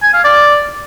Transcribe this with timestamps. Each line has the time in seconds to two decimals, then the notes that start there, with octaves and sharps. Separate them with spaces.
0.03 G#5
0.14 F5
0.24 D5